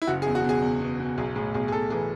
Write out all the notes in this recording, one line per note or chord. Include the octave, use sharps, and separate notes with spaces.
E4
F#1 F#4
G#4
E2
F#4
B2
G#4
E2
B2
B2
B1 G#4
A2 G#4
B1 G#4
G#4
B1 A4
E3 G#4